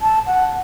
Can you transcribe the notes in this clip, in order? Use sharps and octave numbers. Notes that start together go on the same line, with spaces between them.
A5
F#5